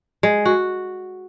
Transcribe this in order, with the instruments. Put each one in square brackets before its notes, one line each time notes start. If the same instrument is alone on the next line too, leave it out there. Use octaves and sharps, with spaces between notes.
[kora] G#3
F#4